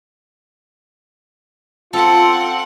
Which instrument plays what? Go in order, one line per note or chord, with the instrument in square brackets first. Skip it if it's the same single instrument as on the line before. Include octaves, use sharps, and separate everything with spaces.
[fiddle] C4 F#5 [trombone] F4 [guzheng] A4